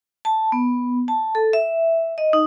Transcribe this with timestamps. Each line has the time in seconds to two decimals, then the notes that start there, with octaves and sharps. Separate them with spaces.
0.25 A5
0.52 B3
1.08 A5
1.35 A4
1.53 E5
2.18 D#5
2.33 D#4